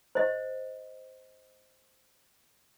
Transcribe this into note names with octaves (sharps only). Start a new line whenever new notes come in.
C5 D#5